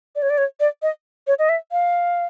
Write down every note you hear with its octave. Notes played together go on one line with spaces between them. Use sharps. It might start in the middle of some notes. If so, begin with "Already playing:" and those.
D5
C#5
D5
C#5
D5
D#5
C#5
D#5
E5
F5